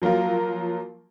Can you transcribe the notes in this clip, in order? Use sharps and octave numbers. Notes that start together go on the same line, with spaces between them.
F3 F#3 A#3 F4 A#4